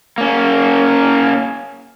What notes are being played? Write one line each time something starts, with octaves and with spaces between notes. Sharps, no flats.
A#3 C#4